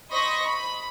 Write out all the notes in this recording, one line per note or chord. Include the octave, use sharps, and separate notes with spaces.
C5 D#5 B5 C#6 A#6
B5